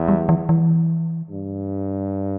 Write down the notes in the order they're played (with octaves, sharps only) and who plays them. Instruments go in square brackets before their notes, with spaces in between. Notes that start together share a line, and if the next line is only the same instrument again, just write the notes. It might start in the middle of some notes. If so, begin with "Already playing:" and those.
Already playing: [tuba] E2
[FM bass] G3
E3
E3
[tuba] G2